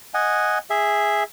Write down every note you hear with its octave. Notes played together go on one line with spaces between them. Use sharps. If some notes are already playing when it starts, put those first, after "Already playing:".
D#5 F#5 G#5
G#4 E5